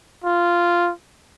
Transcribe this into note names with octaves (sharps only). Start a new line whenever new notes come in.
F4